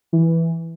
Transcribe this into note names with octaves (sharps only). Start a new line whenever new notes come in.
E3